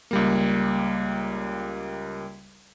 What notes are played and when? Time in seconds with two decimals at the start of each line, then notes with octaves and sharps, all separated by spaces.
0.11 C#2 G3 A#3